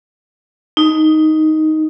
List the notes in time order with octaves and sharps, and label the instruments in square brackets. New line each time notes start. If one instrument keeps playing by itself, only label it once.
[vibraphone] D#4